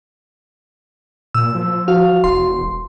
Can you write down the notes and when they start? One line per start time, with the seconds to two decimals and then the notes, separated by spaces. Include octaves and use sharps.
1.34 A#2 E6
1.55 F3
1.88 F#4 F5
2.24 E1 C6